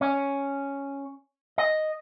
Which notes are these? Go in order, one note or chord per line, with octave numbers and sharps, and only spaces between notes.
C#4
D#5